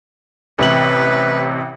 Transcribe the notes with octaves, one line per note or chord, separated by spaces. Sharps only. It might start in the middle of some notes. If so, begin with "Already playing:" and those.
A1 C3 B4 F#7